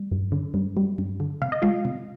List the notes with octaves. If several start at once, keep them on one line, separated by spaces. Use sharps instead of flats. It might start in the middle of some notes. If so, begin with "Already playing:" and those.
Already playing: G3
G2
D3
G2
G3
G2
D3
C3 F5
D#5
G#3 F4 F5
C3